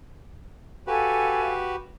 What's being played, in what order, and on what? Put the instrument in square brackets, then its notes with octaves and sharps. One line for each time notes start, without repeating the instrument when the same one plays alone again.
[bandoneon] F#4 G4 B4 [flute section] A4 F5 G#5